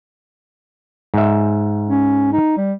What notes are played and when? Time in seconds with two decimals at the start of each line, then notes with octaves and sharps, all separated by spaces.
1.14 G#2 E5
1.89 C#4
2.33 D#4
2.57 G3